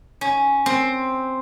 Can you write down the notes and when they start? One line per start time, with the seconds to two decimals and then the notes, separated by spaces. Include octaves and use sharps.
0.21 C#4
0.66 C4